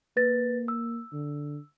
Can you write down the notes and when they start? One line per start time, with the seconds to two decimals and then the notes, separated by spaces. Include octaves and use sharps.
0.17 A#3 B4 A6 A#6
0.68 E6
1.13 D3